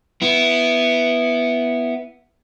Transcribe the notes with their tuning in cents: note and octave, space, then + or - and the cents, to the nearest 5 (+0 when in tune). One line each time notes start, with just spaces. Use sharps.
B3 +0 E4 +5